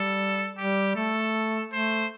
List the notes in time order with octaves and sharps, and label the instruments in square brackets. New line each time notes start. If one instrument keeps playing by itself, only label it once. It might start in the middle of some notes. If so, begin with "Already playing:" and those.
Already playing: [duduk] G3 [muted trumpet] A4
[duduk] G3 [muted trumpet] G4
[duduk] A3 [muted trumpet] A4
[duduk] A3 [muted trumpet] C5